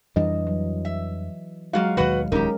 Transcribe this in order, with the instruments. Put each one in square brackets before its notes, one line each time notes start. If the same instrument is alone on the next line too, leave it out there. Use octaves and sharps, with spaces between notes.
[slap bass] F2 G3 D4 [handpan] E3 D#5
[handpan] F#3
[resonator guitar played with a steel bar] E5
[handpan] F#3 G#3 F5 [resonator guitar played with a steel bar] A#3 F4 F#4
[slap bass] D#2 B2 D#3 [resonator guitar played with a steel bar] F#4 B4 F#5
[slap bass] D#1 C#2 D#3 [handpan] G#3 C#4 A#4 [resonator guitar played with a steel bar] D#4 G4